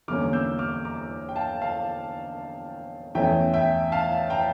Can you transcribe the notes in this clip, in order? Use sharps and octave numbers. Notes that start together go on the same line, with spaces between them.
E2 D3 G3 A#3 C#4 D6 F6
E6 G6
D6 F6
A#5 D6
G5
F5 A5
F5 A5
E2 E3 A3 C#4 E5 G5
E5 G5
F5 A5
G5 A#5